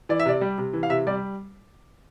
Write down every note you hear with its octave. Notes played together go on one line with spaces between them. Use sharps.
E3 D5
E5
C3 D5
G3
C3
E3
F5
C3 E5
G3 D5